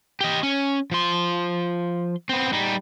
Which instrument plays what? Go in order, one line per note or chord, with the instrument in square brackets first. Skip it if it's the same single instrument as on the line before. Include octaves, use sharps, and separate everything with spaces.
[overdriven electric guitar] G4 D#5
C#4
F3 C6
B3 C4
G3 D#4